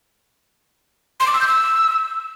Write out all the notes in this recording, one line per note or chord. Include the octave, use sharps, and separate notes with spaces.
C6
D6
E6
G6
E6